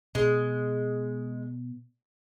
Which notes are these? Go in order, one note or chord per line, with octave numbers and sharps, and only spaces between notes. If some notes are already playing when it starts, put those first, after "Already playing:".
B2 G#3